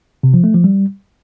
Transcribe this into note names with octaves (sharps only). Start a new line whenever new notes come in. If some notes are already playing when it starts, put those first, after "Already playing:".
C3
F3
A3
F3
G3